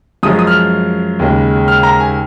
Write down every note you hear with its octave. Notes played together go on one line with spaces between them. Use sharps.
F#2 F3 G#3 C#4 D#6
D#6
F6
D#2 C#3 G#3
F6
A#5
G#5